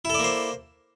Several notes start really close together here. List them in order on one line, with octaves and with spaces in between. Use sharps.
E4 A4 D5 A#3 C5